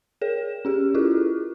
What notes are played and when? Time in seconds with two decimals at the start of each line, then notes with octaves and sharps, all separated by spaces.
0.21 G#4 A#4 C#5 E7
0.65 C#4 G4 G#4
0.94 E4 F4 G#4 A4